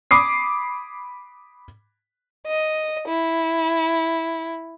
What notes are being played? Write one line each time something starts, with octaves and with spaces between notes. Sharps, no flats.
B5 D6 D#6 C7
D#5
E4